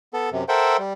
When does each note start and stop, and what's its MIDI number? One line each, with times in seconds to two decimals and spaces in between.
0.14 0.30 59
0.14 0.30 69
0.32 0.44 42
0.32 0.44 48
0.49 0.77 69
0.49 0.77 70
0.49 0.77 72
0.49 0.77 76
0.49 0.77 78
0.49 0.77 79
0.79 0.93 55